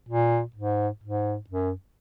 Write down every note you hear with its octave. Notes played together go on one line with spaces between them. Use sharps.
A#2
G#2
G#2
F#2